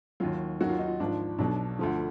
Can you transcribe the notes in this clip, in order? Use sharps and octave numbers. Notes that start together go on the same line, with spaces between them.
D#2 D#3 F#3 F4
D#2 D#3 F#3 F#4
F4
D#4
F4
G#1 G#2 F3 D4
B1 B2 F#3 D4
D2 D3 F3